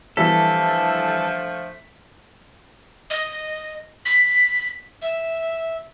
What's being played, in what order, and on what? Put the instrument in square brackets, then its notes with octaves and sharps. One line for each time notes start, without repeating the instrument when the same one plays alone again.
[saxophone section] D3 F3 A3 [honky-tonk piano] E3 G3 [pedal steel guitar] A4 [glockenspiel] B6
[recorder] D#5
B6
E5